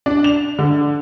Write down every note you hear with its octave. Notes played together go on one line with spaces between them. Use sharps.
D4
F7
D3